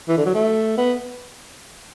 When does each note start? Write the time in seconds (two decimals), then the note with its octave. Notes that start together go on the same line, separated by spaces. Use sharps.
0.09 E3
0.17 D3
0.26 F#3
0.34 A3
0.78 B3